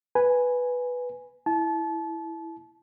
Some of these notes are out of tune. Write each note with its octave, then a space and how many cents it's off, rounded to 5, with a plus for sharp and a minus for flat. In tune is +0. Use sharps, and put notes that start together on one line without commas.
B4 +0 G#5 +0
E4 +0 A5 -30